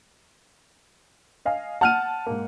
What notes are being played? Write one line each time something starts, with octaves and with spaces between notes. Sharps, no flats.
D#5 F5 G#5
F#5 A5 F6 D#7
G#2 A#3